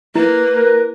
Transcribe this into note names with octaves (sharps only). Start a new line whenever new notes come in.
A#3 E4 B4
A#4